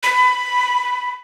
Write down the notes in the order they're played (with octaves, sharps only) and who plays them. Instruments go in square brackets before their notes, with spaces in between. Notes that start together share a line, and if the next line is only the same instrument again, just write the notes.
[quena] B5